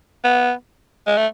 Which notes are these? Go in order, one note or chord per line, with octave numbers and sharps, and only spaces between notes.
B3
G#3
A3